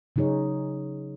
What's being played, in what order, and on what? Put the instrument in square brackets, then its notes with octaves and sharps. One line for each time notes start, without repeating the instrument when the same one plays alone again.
[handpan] C#3 F#3 D#4 G#4 C#5